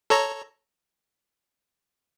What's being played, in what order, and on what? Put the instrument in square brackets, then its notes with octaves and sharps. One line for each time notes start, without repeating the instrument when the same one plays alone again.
[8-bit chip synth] A4 C#5 A#5